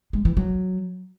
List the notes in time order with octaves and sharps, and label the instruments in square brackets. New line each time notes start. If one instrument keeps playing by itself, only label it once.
[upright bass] G#3
E3
F#3